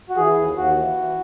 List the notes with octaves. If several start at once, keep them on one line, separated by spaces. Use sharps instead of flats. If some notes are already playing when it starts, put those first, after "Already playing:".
F#4
E3 G#4
D#2
D#2 F#4
E3
E3